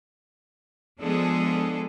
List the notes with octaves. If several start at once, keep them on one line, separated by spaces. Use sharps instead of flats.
F3 G#3 B3 D4 G#4 A4